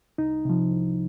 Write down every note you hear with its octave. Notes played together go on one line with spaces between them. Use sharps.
C2 D#4
C3 F3
C2